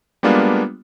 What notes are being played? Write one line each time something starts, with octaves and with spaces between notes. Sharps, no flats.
G3 G#3 A#3 B3 D4 F4